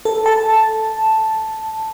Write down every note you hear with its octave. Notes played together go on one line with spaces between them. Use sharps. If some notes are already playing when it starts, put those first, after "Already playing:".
A4
A5